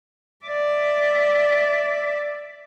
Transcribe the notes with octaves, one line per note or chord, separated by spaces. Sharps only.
D5 E5